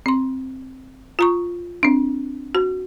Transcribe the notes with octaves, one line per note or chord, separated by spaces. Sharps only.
C4 C6
F4 A#5 C#6
C4 D4
F#4